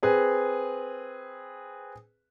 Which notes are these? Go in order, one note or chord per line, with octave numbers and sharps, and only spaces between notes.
C4 G#4 B4